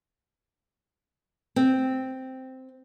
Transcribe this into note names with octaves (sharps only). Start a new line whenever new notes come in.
C4